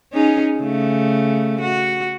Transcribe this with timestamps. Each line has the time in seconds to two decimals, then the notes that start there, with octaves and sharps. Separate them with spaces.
0.13 C#4 D#4 G#4
0.59 C#3 A3
1.61 F#4